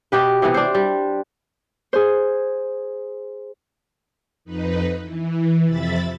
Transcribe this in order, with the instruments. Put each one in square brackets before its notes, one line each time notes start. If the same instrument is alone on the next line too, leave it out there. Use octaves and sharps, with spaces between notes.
[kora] B2 F#4 G4 B4
C3 E3 B3
D4 C5
G3
[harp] G#4 C5
[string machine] F2 D#4 B4
E3
F2 C3 E5 B5 A6